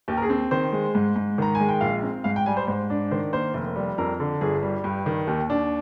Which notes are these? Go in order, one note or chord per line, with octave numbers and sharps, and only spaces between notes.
D#2 G4
A#4
G#4
C4
D#3 C5
G#3
G#2
G#2
D#3 A#5
G#5
G#3
G5
A#1 F5
C4
G#2 F5
G5
G3 G#5
C5
G#2 C5
D4
D#3 C5
A#3 C5
F1
G3
F2 A#4
D3
G1 G#4
G3
G2 G4
D#3
D#2 G4
D4